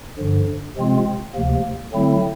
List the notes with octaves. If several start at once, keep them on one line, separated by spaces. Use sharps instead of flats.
G2 D3 F3
C3 F3 G#3 C4 F4
D2 C3 F3 A#3
D3 F#3 A3 C4 E4